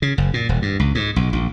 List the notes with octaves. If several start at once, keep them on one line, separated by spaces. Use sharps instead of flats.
C#3
F#1
A#2
D#1
G2
C#2
G#2
B1
A#1